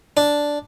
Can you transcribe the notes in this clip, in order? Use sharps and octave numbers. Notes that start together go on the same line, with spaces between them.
D4